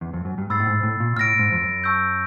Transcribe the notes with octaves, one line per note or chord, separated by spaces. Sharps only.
E2
F2
F#2
G2
G#2 B5 E6 A6 C7
A2
G#2
A2
A#2
A2 F6 A#6 D7
G#2
F2
F#2
A5 C#6 E6 G6